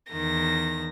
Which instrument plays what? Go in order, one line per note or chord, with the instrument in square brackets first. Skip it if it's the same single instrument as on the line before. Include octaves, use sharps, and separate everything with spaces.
[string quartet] E2 D#3 A#6